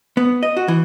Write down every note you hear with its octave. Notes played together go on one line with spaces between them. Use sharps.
B3
D#5
F#4
E3